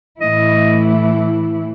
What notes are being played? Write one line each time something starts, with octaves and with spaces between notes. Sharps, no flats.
A2 E3 A3 E4 D#5